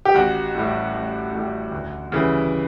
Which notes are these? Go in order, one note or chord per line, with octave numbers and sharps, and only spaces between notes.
G4
A1 F#4
A2 G3
A1
A2 G3
D2
C#3 E3 G3